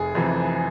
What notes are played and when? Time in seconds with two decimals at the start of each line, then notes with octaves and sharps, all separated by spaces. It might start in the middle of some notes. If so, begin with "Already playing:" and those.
Already playing: F1 G#4
0.15 F2 C3 E3